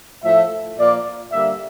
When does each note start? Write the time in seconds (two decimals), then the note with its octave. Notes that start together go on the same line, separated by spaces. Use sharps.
0.23 A2 F3 A3 E5
0.78 A#2 F3 A#3 D5
1.32 D3 G3 A#3 E5